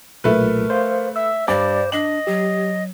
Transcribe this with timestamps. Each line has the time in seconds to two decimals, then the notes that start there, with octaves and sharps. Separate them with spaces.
0.24 B1 A#2 A3 A#4 B4
0.70 C5 F5
1.16 E5 E6
1.48 G2 C5 D5 D6
1.92 D4 D#5 F#7
2.27 F#3 G4